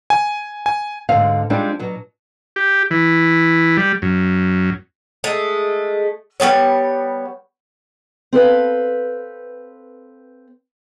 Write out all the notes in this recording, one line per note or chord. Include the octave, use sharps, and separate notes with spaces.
G#5
G#5
D2 G#2 D3 C4 F5
G3 G#3 C4 D4 D#4 F4
B2 F#3 F#4
G4
E3
G3
F#2
G#3 A3
G3 G#3 B3 C#5
C4 A4 B4 F5